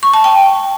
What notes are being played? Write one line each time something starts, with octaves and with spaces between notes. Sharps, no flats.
C#6
A5
G5